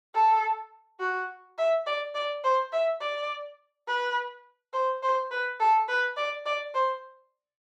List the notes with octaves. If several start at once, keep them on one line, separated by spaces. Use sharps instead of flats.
A4
F#4
E5
D5
D5
C5
E5
D5
B4
C5
C5
B4
A4
B4
D5
D5
C5